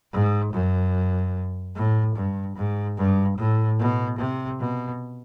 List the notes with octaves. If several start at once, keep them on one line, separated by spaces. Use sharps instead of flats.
G#2
F#2
A2
G2
G#2
G2
A2
B2
C3
B2